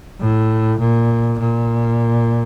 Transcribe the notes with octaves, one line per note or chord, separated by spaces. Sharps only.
A2
A#2
A#2